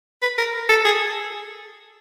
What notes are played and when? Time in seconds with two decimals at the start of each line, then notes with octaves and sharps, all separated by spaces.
0.22 B4
0.38 A#4
0.69 A4
0.85 G#4